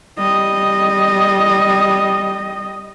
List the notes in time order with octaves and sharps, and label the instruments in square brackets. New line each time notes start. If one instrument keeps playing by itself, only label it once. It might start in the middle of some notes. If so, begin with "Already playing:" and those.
[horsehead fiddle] G3 D#5